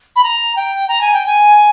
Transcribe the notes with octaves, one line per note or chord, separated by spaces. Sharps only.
B5
A#5
G5
A#5
G#5
G5
G#5